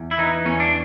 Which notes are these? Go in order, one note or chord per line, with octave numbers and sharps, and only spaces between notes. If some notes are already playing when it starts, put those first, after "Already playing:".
Already playing: E2
E4
E3 D#4
E2 C#4
D4